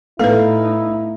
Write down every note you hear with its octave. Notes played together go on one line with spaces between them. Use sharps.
A2 A3 B3 D#4 E4 A4 B4 F5